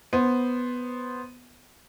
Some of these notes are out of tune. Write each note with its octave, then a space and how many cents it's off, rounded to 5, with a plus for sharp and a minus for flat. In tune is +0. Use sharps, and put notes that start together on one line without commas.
B3 +0 C5 +0